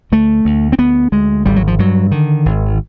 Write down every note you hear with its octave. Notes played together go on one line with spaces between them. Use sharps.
D2 A3
D2
C4
D2 B3
D2 G#3
G#1 G3
F#3
F3
G2 F#3
D3 D#3
G#1